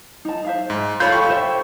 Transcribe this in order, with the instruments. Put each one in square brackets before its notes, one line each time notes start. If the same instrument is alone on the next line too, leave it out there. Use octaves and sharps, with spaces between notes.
[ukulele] D#4 A5
C5 E5 F5
[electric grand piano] G#2
[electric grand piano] F4 C#5 [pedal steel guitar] A4 B5 G6 [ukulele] F5
[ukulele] G4 F5 [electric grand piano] C#6
[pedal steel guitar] C5 E5 G5